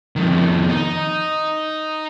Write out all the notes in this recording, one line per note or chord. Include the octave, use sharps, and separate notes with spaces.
F2 D#3
D#4